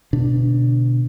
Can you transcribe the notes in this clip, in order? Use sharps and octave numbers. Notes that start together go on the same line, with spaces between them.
B2 D3 D4